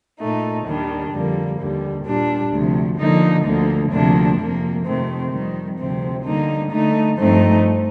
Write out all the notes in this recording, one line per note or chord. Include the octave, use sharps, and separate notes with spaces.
A#2 A3 D#4
D#2 D#3 G3 D4
F2 D3 G3 A#3
D#2 D3 G3
A#2 G3 D4
D2 C3 F3
D3 F3 A#3 D#4
D2 D3 F3 A#3
D2 C3 F3 A#3 D4
F2 C3 F3 A#3
F2 C3 D#3 A3 C4
F2 D#3 G3
D2 C3 F3 C4
D3 G3 A#3 D#4
D3 A3 D#4
G2 F3 A3 C4 D#4